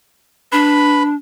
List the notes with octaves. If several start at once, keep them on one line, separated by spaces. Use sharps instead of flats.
D4 B4 B5